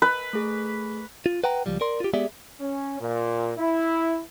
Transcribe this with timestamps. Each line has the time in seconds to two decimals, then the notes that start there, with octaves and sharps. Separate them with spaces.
0.02 B4
0.33 A3 G#4
1.26 F4
1.44 B4 F#5 G5 A#5
1.66 C#2 F3 G3
1.81 A#4 D5 C6
2.00 F4 G4
2.14 G#3 B3 G4 G#4 D5 E5
2.60 C#4
3.00 A#2
3.57 E4